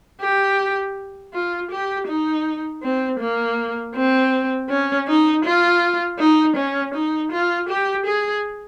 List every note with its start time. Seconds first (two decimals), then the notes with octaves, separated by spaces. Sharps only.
0.21 G4
1.34 F4
1.71 G4
2.07 D#4
2.83 C4
3.20 A#3
3.95 C4
4.70 C#4
5.08 D#4
5.45 F4
6.19 D#4
6.56 C#4
6.94 D#4
7.32 F4
7.69 G4
8.06 G#4